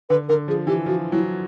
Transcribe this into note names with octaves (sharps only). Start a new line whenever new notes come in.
D3 B4
D3 A#4
F3 G#4
E3 G4
F3 F#4
F#3 E4